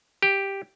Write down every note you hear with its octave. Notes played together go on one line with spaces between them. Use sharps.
G4